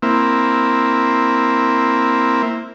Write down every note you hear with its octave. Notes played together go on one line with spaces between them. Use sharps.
A#3 C4 E4